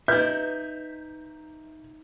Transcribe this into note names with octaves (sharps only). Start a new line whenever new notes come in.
D#4 B4 D#5 E5 G6